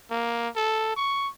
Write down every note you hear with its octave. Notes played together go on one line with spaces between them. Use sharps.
A#3
A4
C#6